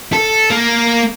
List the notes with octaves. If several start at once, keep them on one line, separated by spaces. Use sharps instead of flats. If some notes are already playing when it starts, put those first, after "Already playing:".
A4
A#3